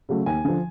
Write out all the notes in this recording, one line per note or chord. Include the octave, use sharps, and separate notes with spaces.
C#3 F#3 A3
D#2 G#5
D3 F3